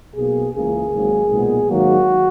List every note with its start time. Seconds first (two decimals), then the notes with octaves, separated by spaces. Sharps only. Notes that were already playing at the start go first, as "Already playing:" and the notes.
0.16 B1 B2 A#3 G#4
0.55 C#2 C#3 E3 A#3 G#4
0.93 G#1 G#2 F#3 A#3
1.30 B1 A#2 G#3 B3
1.67 G#1 G#2 D#3 F#3 A#3 F#4